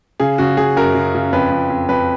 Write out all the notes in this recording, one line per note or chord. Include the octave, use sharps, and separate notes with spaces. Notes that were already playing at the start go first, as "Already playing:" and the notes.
C#3 G#4
C#3 F#4
C#3 G#4
F#2 A#4
C#3
C#3
F2 B4
F2
F2
F2 B4